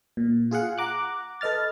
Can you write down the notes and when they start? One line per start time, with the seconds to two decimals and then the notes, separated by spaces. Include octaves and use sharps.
0.17 A#2
0.51 F4 G#4 F5 F#5
0.78 F#5 A#5 D6 F#6
1.41 A4 B4 D#5 F6 A6